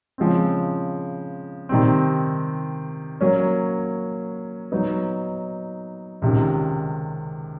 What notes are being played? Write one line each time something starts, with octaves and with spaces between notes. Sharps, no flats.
C#3 F3 G#3 C4
C3 D#3 G3 C4
F#3 A#3 C#4
F#3 B3 D#4
C#2 C3 D#3